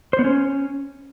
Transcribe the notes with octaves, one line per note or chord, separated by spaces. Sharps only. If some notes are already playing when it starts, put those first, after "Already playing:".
C5
B3
C#4